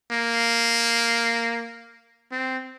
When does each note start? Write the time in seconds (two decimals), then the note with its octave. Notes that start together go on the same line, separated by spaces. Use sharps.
0.11 A#3
2.31 C4